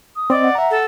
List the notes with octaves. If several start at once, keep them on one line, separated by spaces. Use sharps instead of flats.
D#6
C4 D5 D#5
F#5
E5 A#5
A4